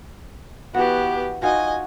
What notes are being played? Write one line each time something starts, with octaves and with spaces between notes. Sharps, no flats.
E3 B3 F#4 G4
D#4 F4 F#4 D#5 G#5